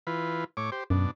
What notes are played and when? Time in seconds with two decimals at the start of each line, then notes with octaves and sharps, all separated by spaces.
0.07 E3 F4 B4
0.57 A2 C#5 D6
0.72 G4 C5
0.90 F#2 B2 D4